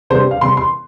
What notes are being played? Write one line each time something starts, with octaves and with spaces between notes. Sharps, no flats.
C3 G3 D4 C5
F5
C3 G3 C4 C6
C6